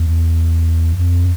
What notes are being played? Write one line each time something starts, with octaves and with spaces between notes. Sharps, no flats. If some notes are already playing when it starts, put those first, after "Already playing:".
Already playing: E2
F2